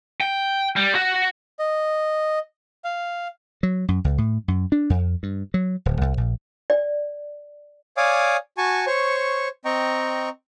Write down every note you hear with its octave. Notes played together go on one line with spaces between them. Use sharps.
G5
G3
F#4
D#5
F5
F#3
F#2
C#2
A2
F#2
D4
F2
G2
F#3
D1
C2
A#1
D5
C#5 D5 F5 G#5 D6 D#6
F#4 G#5 A5 C#6
C5 C#5 C#6
C4 D#5 G5 A#5 C#6